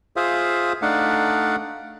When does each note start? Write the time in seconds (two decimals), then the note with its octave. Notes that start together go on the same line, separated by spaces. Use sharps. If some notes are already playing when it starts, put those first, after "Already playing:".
0.16 F4 G#4 C5 E5 F5 D#6
0.82 A3 D4 D#4 D5 F5 F#5